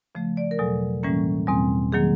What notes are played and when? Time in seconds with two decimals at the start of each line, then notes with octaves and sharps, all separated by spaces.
0.15 C#3 F3 A3
0.37 D5
0.51 A#4
0.58 E2 B2 F#3 A4
1.03 A2 E3 G3 A#3 C#4
1.47 E2 B2 G3 C4
1.92 D#3 F#3 A#3 G#4